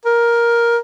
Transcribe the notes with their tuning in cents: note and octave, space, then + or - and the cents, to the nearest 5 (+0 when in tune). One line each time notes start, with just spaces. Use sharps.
A#4 +10